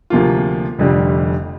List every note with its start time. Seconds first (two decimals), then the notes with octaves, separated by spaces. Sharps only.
0.10 D2 C3 F3 A#3 F4
0.79 F1 F2 D3 G3